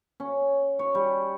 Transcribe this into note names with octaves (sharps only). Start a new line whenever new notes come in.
C#4
C#5
G3